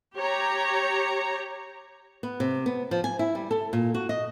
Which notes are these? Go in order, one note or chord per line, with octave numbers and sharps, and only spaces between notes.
G4 C#5 A#5
B3
C3
B3
F3
G#5
E4
G3
A4
A#2
F#4
D#5